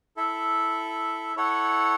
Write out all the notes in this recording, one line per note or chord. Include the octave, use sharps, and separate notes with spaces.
E4 A4 E5
E4 A4 C#5 F#5